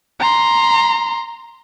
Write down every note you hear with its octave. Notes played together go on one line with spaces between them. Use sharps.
A#5 C6